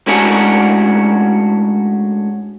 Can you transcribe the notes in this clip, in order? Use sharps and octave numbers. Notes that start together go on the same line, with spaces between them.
A2 G#3 C#4 D4 F#4 G#4